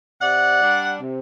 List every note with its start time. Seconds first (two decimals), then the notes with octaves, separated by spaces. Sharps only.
0.21 C3 D5 F#5
0.61 G3 D4
1.01 C3